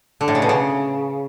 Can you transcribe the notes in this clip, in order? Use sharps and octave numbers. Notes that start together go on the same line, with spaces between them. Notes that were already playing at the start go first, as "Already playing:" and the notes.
D3
A2
C#3
B2
C#3